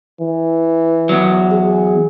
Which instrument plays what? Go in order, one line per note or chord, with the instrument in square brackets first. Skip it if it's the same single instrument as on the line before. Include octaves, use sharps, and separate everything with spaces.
[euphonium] E3
[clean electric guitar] E2 F#3
[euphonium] G#4